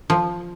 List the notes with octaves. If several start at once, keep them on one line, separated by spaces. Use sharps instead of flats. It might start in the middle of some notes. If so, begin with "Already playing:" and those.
F3